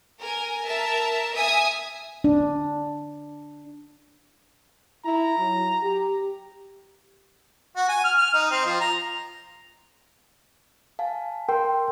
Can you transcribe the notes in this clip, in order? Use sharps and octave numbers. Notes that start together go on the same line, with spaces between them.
A#4 G#5
A#4 E5 A5
E5 G#5 D#6
D4
E4 A#5
F#3
G4
F#4
G#5
F6
F6
D#4
C4
F3
A#5
F5 G#5 A5
A#4 G5 C6